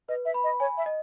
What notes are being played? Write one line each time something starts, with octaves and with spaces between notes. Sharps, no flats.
B4 D#5
E5
B5
D#5
C#5 G#5
E5
D#5